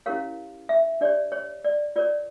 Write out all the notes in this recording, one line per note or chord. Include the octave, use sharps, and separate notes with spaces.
C#4 E4 G4 A#4 C#5 F5
E5
D4 G4 C#5 D5
C#5
D5
F4 A#4 C#5 D5